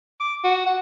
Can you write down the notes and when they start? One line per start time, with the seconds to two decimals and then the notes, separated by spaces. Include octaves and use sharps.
0.20 D6
0.43 F#4
0.66 F#5